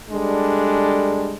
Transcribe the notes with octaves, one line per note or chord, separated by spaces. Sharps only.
G3 G#3 D4 A4